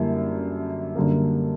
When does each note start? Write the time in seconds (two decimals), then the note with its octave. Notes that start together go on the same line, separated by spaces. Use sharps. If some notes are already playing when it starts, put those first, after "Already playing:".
Already playing: F#2 D3 G3 A#3 E4
0.95 F#2 D3 G3 A#3